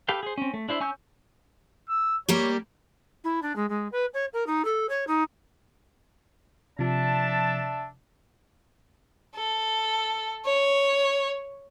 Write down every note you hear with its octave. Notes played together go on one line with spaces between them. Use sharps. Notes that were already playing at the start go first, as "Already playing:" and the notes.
G4 A4 B4 F5 G5
G#4 C5
C4 C#4
A3
D4 E4 C5 E5
C#4 G#5 C#6 E6 G6
E6
G3 A#3 G4 C#5
E4
D4
G#3
G#3
B4
C#5
A#4
D#4
A4
C#5
D#4
C3 F3 D4 E5 A5
A4
C#5